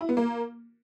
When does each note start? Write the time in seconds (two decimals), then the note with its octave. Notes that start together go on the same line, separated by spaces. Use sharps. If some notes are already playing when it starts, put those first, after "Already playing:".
0.01 E4
0.09 B3
0.17 A#3